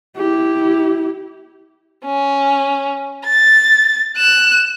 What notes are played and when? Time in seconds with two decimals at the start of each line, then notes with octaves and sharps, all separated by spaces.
0.17 E4 G4
2.05 C#4
3.25 A6
4.17 F#6 E7